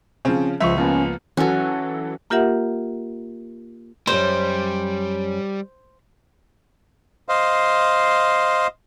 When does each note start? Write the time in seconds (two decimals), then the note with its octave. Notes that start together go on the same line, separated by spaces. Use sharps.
0.25 C#3 F3 C4 C#4
0.60 C#2 F3 E5 C#6
0.78 F3 A#3 B3 C#4
1.37 E3 F#3 C#4 F#4 A4
2.30 A#3 F4 G4 A#4 E5 F#5
4.07 F#2 B2 G3 C5 D#5
7.29 C5 D#5 F5